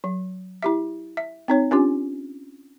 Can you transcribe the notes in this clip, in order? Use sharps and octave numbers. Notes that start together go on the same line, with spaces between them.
F#3
E4 G4 E5
E5
C4 D#4 C#5
C#4 D4 F4 G4